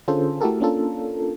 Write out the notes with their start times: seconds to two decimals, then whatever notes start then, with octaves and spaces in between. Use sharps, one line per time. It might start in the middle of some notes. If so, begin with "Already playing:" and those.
0.08 D3 C#4 F4 G#4 A4 C5
0.41 A3 E4 F#4 G4 A4 A#4
0.60 A#3 C#4 D4 F4 A4 A#4